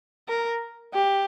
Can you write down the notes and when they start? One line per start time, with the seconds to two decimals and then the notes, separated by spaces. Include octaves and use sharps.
0.29 A#4
0.93 G4